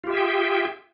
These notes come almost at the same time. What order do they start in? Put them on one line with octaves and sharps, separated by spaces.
F4 G4 E5 G#4 G5